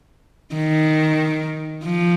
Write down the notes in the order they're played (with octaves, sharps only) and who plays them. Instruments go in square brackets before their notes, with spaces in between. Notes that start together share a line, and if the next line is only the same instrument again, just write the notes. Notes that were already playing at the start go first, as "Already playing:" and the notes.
[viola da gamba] D#3
F3